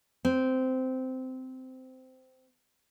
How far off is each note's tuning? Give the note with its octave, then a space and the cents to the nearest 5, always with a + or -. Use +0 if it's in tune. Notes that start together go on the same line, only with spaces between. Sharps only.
C4 -15